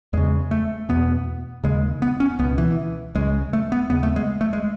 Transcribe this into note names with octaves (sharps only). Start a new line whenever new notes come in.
E2 C#3 G#3
A3
E2 B2 B3
D#2 C#3 G#3
B3
C#4
C#2 B2 B3
E3
C#2 C#3 G#3
A3
B3
D#2 C#3 B3
A3
G#3
A3
G#3